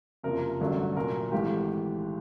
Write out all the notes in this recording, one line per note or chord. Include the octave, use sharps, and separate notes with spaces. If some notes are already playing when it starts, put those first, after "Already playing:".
F#1 F2 C3 F3 A#4
A1 G2 D3 F#3 A3
C2 A#2 F#3 A#4
G#1 G#2 E3 A3 G4